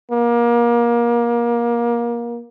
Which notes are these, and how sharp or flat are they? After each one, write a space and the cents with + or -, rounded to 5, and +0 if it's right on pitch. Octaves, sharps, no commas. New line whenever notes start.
A#3 +25